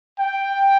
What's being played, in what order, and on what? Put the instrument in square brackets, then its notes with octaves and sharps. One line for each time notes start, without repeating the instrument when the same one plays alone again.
[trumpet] G5